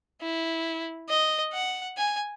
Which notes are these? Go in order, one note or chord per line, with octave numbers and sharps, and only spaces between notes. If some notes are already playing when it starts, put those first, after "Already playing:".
E4
D#5
F#5
G#5